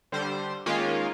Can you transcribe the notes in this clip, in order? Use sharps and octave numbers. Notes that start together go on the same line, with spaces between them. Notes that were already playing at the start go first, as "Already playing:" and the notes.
D3 G3 C5
D#3 G#3 A#3 C#4 F4